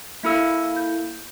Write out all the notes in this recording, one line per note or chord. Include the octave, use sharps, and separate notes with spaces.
A#3 E4 A4 E5 E6
G6